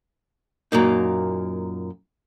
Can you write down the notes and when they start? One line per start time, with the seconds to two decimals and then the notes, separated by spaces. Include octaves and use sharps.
0.72 F#2 A#2 A#3 D#4